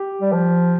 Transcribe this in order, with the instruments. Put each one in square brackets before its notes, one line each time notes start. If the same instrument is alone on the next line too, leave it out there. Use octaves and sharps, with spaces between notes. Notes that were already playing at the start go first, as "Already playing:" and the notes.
Already playing: [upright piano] G4
[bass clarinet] G3
F3